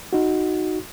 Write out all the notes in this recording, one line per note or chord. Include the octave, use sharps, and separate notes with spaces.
D#4 F#4